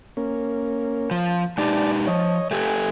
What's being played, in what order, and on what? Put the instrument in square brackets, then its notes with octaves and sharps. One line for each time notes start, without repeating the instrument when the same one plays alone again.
[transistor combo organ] A#3 C#4
[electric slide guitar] F3
[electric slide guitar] G#3 D#4 G4 [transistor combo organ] D5 A5
[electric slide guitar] F3 [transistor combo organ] C#5 D#5
[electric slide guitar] A3 G4 A4 [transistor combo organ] G#5